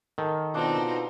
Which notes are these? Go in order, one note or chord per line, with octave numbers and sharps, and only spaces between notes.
D#3 A4
B2 C4 D4 D#4 F4